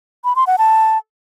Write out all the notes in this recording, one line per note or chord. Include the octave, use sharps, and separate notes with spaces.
B5
C6
F#5
A5